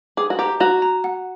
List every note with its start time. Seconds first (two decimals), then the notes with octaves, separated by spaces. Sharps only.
0.17 G#4 D6
0.30 F#4
0.39 G4 A#5
0.60 F#4 A#5
0.82 A#5
1.04 F#5